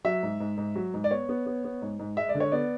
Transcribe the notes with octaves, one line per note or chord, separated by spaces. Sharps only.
F#3 E5
G#2
G#2
G#2
F#3
G#2
D5
B3 C#5
B3
B3
B3
G#2
G#2
G#3 E5
D5
D3
C#5
B3 D5